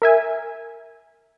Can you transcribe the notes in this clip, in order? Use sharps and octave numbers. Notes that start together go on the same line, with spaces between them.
A#4 E5 G#5